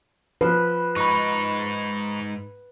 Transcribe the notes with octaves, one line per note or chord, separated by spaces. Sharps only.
F3 B4
G#2 D#4 B5 C#6